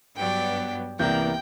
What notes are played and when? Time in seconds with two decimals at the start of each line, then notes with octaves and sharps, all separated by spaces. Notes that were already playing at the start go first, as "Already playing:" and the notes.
0.17 G2 F#3 B3 D5 G5
0.99 C2 E3 A#3 B3 D5 G5 G6